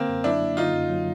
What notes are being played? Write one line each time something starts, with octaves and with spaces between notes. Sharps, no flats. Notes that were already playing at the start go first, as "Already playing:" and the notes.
Already playing: D3 A#3 C4
F#2
F#3 D4 E4
A#3
D3 D#4 F4
F#2
F#3